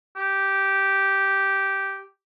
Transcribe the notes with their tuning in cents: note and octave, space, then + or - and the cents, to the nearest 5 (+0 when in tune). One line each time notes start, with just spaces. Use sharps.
G4 -10